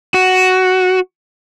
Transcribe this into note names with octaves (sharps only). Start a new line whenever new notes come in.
F#4